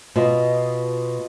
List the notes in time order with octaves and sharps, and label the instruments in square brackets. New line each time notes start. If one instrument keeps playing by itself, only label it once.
[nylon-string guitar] B2 [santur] F4 D#5